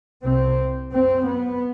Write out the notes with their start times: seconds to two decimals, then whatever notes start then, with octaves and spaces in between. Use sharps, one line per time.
0.23 C2 C3 C4
0.92 F#2 C4
1.27 B3